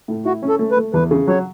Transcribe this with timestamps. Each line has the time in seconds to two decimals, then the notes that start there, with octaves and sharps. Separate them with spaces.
0.08 A2
0.25 E4 F#4
0.42 C#4
0.49 A4
0.59 A3
0.72 B4
0.77 A3
0.94 E2 B4
1.11 C#3
1.28 F#3 C#5